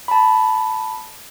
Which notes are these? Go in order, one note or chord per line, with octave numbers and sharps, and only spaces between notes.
A5 B5